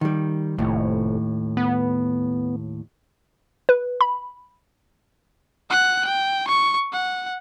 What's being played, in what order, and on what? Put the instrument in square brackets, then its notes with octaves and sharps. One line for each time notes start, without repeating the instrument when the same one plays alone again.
[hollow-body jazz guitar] D#3 G3
[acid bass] F1 [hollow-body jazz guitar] D#2 A2
[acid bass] B3
[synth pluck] B4
B5
[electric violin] F#5 F#6
G5
C#6
F#5